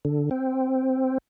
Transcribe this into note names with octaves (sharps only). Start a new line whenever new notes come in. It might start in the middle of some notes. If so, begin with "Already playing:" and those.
D3
C4